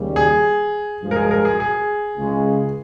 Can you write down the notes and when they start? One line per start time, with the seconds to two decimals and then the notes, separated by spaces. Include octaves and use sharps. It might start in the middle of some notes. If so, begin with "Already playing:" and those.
Already playing: D#2 C#3 G3
0.16 G#4
1.03 G2 F3 G#3
1.11 A#4
1.16 G#4
1.31 A#4
1.45 G#4
1.60 G#4
2.17 C#2 C#3 G#3